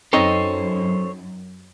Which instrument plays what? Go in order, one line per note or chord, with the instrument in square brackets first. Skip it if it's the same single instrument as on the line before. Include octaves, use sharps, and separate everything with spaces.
[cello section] F#2 [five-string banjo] C4 D#4 D#5 [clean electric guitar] A4 C5 C#5